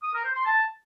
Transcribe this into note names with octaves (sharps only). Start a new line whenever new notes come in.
D#6
A#4
C5
C6
A5